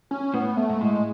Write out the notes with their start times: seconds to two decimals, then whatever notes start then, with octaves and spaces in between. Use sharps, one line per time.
0.11 C#4
0.34 A2 B3
0.57 A3
0.70 G#2
0.81 A2 G#3